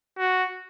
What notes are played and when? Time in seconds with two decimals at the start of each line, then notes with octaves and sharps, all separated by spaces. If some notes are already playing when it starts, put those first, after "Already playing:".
0.18 F#4